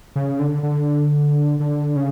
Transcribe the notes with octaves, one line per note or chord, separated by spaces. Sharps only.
C#3
D3
D3
D3
C#3